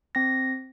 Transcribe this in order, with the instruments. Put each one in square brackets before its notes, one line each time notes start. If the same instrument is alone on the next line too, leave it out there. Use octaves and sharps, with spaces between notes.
[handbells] C4 A#6